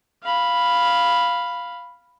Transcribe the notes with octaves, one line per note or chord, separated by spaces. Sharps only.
F5 B5